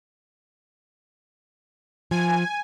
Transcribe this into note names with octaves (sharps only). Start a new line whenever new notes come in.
F3 G#5